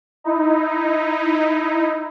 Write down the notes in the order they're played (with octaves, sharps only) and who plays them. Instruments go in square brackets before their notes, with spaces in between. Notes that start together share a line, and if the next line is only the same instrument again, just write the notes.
[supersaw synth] D#4 E4